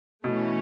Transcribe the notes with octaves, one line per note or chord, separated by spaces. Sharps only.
B2 E3 A3 C#4